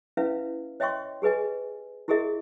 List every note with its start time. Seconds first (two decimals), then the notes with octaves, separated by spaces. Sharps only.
0.17 C#4 E4 B4 E5 F5
0.80 C#5 D#5 E5 G5 C6 C#6
1.22 G4 G#4 B4 D#5 G#5
2.08 E4 G4 G#4 A#4 D#5 E5